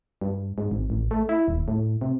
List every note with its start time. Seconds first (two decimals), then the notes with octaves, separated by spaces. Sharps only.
0.21 G2
0.58 G#2
0.71 G#1
0.90 A1
1.11 A3
1.29 E4
1.48 D#1
1.68 A2
2.01 C3